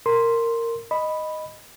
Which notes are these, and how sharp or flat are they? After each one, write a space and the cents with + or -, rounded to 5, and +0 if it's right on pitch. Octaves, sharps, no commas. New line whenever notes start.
A#4 -15 C6 +0
D#5 +0 B5 +0